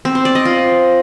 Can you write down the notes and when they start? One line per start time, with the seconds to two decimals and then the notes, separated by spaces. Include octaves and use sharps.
0.05 C4
0.15 C5
0.25 D5
0.35 D#5
0.45 F4